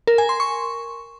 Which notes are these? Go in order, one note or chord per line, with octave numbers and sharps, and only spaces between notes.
A#4
G#5
C6
C#6